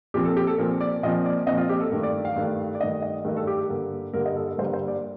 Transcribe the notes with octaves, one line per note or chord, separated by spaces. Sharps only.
A#2 F3 C4 G4
A4
G4
A4
A#2 F3 C4 A#4
D5
A#2 F3 C4 D#5
D5
A#2 F3 C4 D#5
F4
G4
A4
G2 D#3 A3 A#4
D5
F5
G2 D#3 A3
D5
G2 D#3 A3 D#5
D#5
G2 D#3 A3 A#4
A4
G4
G4
G2 D3 G3 A#3 A4
G2 D3 G3 A#3 A#4
D#5
A4
A4
G2 D3 G3 A#3 C5
C5
D5